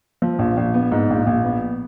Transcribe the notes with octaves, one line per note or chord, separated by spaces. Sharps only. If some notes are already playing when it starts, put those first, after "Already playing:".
F3
A#1
A#1
B3
G#2
A#1
A#1
B3